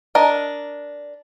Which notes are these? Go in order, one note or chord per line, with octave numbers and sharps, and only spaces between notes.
D4 A#4 D#5